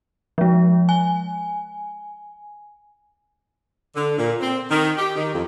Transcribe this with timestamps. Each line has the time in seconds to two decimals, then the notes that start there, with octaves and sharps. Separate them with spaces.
0.38 F3 G#3
0.89 G#5
3.95 D3
4.18 A#2
4.40 C4
4.70 D#3
4.98 G4
5.16 D#3
5.33 F2